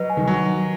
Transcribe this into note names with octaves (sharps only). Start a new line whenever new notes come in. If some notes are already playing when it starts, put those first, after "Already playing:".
Already playing: F#3 B4 D#5
G#5
D#3
F#3